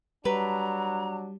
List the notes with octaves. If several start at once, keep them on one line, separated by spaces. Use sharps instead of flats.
F#3 G3 D4 B4 A#5